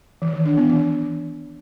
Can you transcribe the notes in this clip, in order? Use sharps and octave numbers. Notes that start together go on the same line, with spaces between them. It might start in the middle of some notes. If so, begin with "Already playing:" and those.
E3
D#3
D4
B3
E3